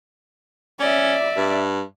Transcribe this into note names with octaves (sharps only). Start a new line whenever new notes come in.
C#4 D5 E5
G2